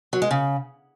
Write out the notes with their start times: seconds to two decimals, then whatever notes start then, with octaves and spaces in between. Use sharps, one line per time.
0.13 F#3
0.22 G#3
0.31 C#3